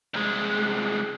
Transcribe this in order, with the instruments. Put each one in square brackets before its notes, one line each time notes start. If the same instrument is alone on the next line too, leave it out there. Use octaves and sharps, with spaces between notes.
[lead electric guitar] C2 G#3